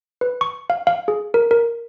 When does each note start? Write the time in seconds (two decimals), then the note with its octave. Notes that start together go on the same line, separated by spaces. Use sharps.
0.21 B4
0.41 C#6
0.70 F5
0.87 F5
1.08 G#4
1.34 A#4
1.51 A#4